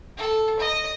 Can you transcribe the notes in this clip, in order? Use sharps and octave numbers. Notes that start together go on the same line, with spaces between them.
A4
D#5